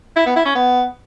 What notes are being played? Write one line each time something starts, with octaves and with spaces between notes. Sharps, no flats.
E4
B3
E4
C#4
B3